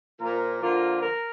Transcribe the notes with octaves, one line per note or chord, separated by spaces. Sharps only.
A#2 F3 A#3 F4 A#4
D3 F3 A#3 F4 A#4
A#4